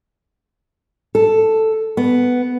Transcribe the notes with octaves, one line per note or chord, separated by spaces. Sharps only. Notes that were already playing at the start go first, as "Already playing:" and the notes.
A4
B3